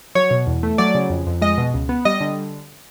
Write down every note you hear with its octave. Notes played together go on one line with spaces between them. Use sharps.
F#3 C#5
B2
E2
A3
F#3 D5
C#3
F2
F2
G#3 D#5
B2
C#2
B3
G3 D#5
D3